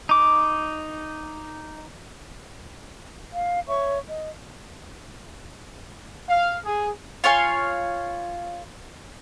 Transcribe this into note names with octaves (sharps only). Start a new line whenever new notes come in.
D#4 D6
F5
C#5 E5 C#6
D#5
F5
G#4
F4 C#5 F5 G#5